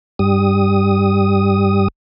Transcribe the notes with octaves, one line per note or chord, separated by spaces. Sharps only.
G2 G3 D#6